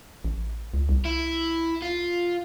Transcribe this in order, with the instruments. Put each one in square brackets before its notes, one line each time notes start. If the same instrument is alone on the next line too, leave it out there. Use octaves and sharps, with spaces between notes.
[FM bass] A1
C#2
C2
[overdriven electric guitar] E4
F4